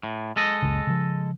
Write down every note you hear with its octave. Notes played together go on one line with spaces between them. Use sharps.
A2
G#3 A4 D#5
F#1 C#2 C#3
C#3 F3